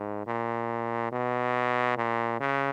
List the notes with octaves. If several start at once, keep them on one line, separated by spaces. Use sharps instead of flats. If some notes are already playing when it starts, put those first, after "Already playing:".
Already playing: G#2
A#2
B2
A#2
C#3